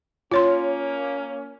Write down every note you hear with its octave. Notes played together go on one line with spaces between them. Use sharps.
A#3 C#4 F4 C#5 C6